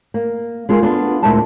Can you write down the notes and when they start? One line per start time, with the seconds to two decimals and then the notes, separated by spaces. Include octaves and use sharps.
0.14 A#3
0.69 G#3 F4 G#4 A#4
0.83 B3 D4 F4 A4
1.22 D2 A#2 D3 G#3 E4 A5